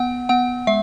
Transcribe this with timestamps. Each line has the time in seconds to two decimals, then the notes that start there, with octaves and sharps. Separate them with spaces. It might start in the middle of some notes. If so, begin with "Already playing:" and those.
Already playing: B3 F#5
0.29 B3 F#5
0.67 G#3 E5